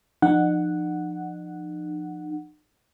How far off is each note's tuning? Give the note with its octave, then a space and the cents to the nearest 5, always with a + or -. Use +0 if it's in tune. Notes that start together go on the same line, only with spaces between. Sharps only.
F3 +0 D#4 -40 F#5 +0